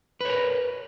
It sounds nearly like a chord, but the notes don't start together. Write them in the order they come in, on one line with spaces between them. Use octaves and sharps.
B4 C#5 A#4